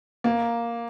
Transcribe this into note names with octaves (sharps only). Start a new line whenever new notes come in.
A#3